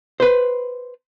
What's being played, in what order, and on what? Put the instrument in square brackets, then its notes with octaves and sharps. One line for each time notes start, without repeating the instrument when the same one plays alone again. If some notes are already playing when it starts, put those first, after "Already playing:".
[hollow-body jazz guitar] B4 C5